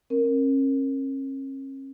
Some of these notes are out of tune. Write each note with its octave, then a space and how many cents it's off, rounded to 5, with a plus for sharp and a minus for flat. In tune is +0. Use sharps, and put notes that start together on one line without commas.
C#4 -40 A#4 +0